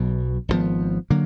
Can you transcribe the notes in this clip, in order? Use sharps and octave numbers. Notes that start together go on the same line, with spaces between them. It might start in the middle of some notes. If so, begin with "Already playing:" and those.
Already playing: B1 B2 F#3
G#1 F#2 F3 B3
D3 F#3 A#3